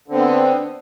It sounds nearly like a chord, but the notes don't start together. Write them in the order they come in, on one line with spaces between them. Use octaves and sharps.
D3 C4 B3